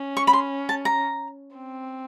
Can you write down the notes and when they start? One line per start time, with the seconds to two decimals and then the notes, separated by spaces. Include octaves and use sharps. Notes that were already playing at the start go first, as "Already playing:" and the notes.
Already playing: C#4
0.17 C#6
0.27 B5
0.33 C6
0.69 A5
0.85 A#5
1.55 C4